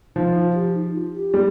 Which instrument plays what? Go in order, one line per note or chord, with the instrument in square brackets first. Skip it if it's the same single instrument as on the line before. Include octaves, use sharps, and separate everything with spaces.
[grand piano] F3 [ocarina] D#4
[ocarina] F4
F4
G4
D#4
F4
G4
[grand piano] G3